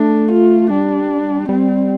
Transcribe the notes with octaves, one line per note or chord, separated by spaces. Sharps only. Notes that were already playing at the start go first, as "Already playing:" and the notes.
Already playing: A3 D4
F4
G3 D4
G3 C4